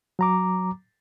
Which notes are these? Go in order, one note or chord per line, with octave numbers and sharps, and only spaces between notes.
F#3 A#5 D6